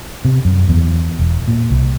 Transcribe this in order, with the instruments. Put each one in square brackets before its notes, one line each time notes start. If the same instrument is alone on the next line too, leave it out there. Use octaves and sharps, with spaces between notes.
[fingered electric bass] C3
F#2
E2
E1
A#2
C2